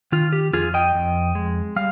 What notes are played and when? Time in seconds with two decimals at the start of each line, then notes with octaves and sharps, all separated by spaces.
0.12 D#3 F4
0.33 G4
0.53 F2 F4 G#4
0.74 D#5 G5
0.95 F2
1.35 G#3
1.76 G3 F5